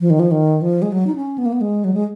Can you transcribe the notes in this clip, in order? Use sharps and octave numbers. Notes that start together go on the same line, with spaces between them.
F3
D#3
F3
D#3
F3
G#3
F#3
D#4
C#4
B3
A#3
B3
G#3
F#3
G#3